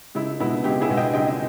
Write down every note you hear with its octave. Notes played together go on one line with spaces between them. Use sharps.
C#2 E4
B2 G#3 B3 E4
C#2 G4
E4 G#4
B2 G#3 B3
D#5 G5
C#2 D#5 G5